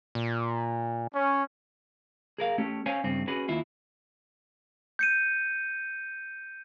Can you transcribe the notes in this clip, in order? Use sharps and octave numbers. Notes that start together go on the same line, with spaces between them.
A#2
C#4
G#4 A#4 F5
A3 C#4 G4
C#4 C5 C#5 F5 G#5
G2 C#3 C4
C#4 F#4 G#4 B4
D#2 E4 F4
G6 C#7 D#7